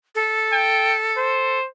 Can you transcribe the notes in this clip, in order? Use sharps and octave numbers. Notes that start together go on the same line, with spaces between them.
A4
G5
C5